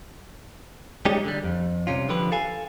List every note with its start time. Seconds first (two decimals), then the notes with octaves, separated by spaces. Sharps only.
1.05 G3 G#3 C#4 D#4 G4
1.24 D3 G3
1.44 F2
1.87 C2 C3 C#4 F4
2.09 D3 F3 G4 B4
2.32 A4 F5 G#5